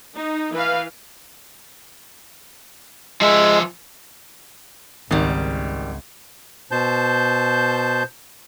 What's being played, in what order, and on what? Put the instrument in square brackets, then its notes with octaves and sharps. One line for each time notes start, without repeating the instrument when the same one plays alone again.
[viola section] D#4
E3 B4 F5
[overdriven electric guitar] F3 E5 [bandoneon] G#3
[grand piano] G#1 [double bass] C#2 [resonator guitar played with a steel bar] D#3 G3
[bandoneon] B2 C5 A5 G6